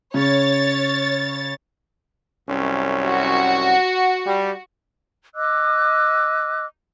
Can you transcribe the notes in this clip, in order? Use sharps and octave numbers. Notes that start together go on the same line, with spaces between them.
C#3 C#5 A6
C2 F#2 C#4
F#4
G3
D#5 D6 E6 F#6